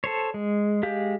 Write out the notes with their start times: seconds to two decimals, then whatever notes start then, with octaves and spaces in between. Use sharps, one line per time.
0.04 A4 C5 C#5
0.34 G#3
0.83 G#3 G4 F5 G6